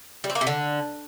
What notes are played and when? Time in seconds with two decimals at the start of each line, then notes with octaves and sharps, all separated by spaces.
0.24 G3
0.30 C4
0.35 A#3
0.41 C3
0.47 D3